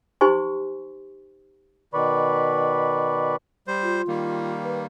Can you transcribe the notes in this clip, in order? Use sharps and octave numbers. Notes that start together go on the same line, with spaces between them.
D#4 G4 C5 G#5 C6 C#6
B2 D#3 B4 D5 B5 C#6
G3 C5
F4
D#3 G3 A#3
B4